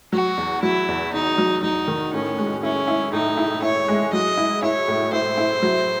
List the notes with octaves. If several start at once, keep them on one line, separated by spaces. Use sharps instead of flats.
F#3 F#4
E2
F#3 E4
E2
E2 D#4
F#3
F#3 D#4
D#3
A2 C#4
G#3
C#4 E4
E4
A2 D#4
E4
E4 C#5
G#3
F#3 D#5
E4
E4 C#5
A2
E4 C5
E4
F#3